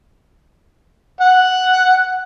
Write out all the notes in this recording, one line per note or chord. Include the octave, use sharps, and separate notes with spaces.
F#5